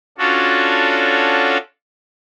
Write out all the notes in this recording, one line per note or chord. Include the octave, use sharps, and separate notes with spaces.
C#4 D4 F4 F#4 A4 C#5